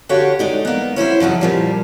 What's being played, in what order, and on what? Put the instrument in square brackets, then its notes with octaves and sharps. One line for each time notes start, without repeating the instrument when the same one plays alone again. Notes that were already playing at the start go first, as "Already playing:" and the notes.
[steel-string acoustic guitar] D3 F#4 G4 C#5 F5
G#3 D#4 D5
A#3 B3
C#4 E4 B4 C5
C#3 F3 F#3 D#4
A#2 F3 G3